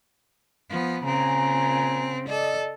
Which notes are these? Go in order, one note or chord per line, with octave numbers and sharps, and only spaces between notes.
F3 B3
A#2 C#3 C4 G#5 A#5
A4 D5 D#5